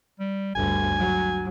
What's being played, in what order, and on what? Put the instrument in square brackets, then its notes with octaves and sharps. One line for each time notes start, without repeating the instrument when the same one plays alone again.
[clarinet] G3
[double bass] G1 D2 [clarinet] G#5
[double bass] F#3